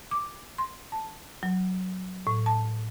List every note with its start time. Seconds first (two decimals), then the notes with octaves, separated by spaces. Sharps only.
0.11 D6
0.58 C6
0.92 A5
1.43 F#3
2.27 A2
2.46 A5